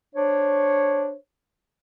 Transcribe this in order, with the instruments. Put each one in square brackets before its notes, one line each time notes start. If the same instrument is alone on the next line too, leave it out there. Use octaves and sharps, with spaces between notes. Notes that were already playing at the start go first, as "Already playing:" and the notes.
[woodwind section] D4 C5 C#5